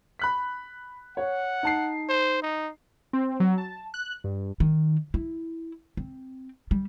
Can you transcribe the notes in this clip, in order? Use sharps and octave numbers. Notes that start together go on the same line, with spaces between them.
B5 F#6 B6
C#5 F#5
D#4 A5 C7
C5
D#4
C4
F#3
A5
F#6
G2
D#3
E4
C4
G3